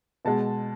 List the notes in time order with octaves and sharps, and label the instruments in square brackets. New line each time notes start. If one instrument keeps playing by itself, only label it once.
[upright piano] B2 G#3 A5